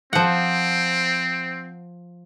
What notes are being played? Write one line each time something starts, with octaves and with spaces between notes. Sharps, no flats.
F3 C4 F#5